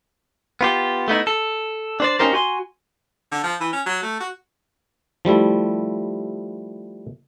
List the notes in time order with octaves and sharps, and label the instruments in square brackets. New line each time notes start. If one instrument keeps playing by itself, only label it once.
[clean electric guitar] B3 F4 G4
A3 B3 D#4 E4
A4
D4 C5 D5
C#4 D#4 F4 G4 A#4 C5
F#4 G#5 C6
[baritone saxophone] D3
F3
E3
C#4
F#3
A3
F#4
[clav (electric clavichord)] F3 G3 A3 E4